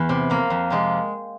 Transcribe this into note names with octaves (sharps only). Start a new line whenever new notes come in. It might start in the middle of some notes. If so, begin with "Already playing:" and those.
Already playing: E2 E3
C3
F3 A#3
F2
C3 F3 G#3